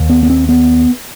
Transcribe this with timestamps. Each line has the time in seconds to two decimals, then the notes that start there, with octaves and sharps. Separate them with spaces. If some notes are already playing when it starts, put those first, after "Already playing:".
Already playing: D#2
0.10 B3
0.23 B3
0.30 C4
0.49 B3